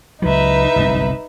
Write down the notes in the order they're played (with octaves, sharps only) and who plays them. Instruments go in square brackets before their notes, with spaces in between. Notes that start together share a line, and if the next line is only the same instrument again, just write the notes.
[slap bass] C#2 F#3 [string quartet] D#4 B4 E5
[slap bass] G1 C2 F#2